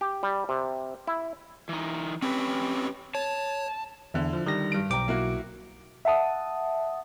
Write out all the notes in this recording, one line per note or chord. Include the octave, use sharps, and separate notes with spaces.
G4
G3
C3
E4
E3 D#4
C4 C#4 G4 B4
C#5 A5
E2 D3 E4
F3
D#3 G3 A#6
G2 D7
B1 G5 A#5 D6
A#3 E4 F#4
E5 F#5 A5 D#6